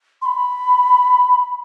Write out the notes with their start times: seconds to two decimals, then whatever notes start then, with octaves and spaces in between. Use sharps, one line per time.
0.22 C6
0.26 B5